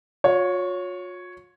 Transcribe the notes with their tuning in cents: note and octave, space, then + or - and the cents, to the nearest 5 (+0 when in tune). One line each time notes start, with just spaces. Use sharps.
F4 +45 C#5 +0